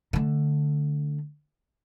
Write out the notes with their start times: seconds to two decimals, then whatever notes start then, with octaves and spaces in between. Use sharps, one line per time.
0.13 D3 A3